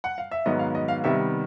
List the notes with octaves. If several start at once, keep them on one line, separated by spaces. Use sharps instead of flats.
F#5
F5
E5
G#2 D#3 F#3 B3 D#5
F5
D#5
F5
C3 D#3 G3 B3 E5